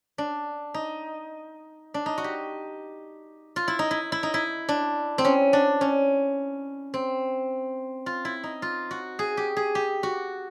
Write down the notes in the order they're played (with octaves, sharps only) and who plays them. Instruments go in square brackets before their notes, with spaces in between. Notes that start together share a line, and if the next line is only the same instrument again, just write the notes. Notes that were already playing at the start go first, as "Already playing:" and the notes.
[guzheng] D4
D#4
D4
D#4
F#4
G4
F4
E4
D#4
E4
E4
D#4
E4
D4
C4
C#4
D4
C#4
C4
F4
E4
D#4
F4
F#4
G#4
G4
G#4
G4
F#4